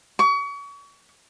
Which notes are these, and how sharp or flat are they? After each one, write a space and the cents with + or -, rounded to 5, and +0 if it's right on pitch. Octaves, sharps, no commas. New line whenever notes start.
C#6 +35